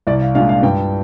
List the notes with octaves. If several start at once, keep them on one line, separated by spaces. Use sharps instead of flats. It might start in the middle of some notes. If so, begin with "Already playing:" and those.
C2 D5
F5
A#2 G#3 D4 F4 F5
F5
G2 G5